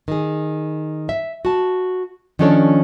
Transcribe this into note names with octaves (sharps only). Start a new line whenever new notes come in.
D#3 G#4
E5
F#4 A5
D#3 F3 C#4 D4 A4 C#5